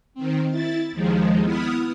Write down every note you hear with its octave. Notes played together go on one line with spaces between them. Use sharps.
D#3 C4
E4 A6
D#2 D#3 F3 G#3
B3 E4 D#6 F6